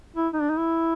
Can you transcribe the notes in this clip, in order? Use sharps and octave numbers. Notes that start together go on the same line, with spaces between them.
E4
D#4
D4
D#4
E4